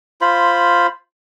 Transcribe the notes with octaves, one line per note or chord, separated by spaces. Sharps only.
F4 C5 B5